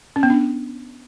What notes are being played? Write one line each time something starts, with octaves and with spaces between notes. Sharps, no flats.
C#4
B3
D4